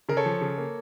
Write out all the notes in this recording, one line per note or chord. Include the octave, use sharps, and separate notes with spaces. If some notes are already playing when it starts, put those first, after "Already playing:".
C#3 A#4
A4 C#5
F3
C#3
A#3